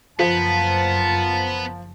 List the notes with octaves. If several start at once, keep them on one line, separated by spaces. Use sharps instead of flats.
F#1 F3 B3 F4 A#4 A5